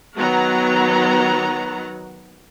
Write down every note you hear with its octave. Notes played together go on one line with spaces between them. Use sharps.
D#3 F#3 B3 F#5 A#5